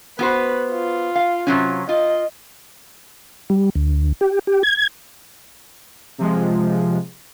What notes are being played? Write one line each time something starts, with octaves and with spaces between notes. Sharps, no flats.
B3 F#4 B4 C5
F4
F5
C3 F#3 C#4
F4 D#5
G3
D2
G4
G4
G#6
C3 F3 G#3